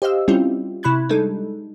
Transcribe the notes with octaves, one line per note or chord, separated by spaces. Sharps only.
G4 C5 D#5 F5 E6
G3 C4 C#4 E4 F4 G4
C3 E4 B5 C#6 F#6 G#6
G3 G#3 D4 D#4 A4